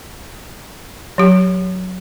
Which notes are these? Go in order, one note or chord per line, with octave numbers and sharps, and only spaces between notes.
F#3 G4